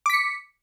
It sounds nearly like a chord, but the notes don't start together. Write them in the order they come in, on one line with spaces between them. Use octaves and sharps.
D6 B6 C#7